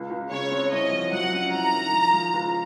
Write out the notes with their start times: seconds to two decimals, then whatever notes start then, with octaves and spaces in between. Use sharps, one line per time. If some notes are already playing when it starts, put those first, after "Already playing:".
Already playing: C#2
0.10 C#2
0.31 C#3 C#5
0.51 C4
0.71 C2 D#5
0.92 F3
1.12 F#3 F#5
1.33 C#4
1.52 C2 A#5
1.73 D#3
1.93 F3
2.13 F3
2.33 C#2